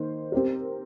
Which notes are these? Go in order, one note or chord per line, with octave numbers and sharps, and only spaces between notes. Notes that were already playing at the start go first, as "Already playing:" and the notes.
Already playing: D#3 A#3 C5
C4 G4 A#4